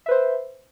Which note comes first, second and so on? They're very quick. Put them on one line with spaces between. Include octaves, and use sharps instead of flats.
E5 B4 C5